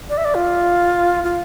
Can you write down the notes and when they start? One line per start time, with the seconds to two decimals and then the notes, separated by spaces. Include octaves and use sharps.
0.10 D5
0.18 E5
0.25 D5
0.35 F4
1.24 F4